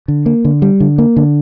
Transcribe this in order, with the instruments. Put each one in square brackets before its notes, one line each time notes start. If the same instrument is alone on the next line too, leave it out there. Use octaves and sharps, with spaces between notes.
[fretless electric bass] D3
A#3
D3
G3
D3
A#3
D3